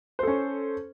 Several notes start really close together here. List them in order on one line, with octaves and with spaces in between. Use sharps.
C5 A4 C#4